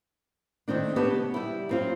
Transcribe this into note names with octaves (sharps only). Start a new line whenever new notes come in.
D#3 A3 C4 D4
B3 G4 B4 C#5 A5
C#3
G3 E4
F#2 C4 F4